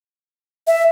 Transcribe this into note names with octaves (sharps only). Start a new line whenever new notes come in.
E5